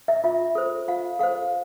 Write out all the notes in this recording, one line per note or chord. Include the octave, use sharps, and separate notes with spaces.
E5
F4 E5
A4 C5
F4 F5
A4 C5 F5